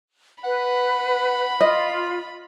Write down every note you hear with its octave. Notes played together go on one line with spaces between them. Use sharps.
B4 F#5 B5
F4 D#5